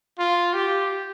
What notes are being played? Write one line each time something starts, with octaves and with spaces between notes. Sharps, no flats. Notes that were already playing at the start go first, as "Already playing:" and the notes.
F4
G4